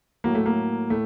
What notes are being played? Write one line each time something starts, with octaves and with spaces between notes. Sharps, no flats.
A2 F#3 A#3
A3
A#3
A2 A3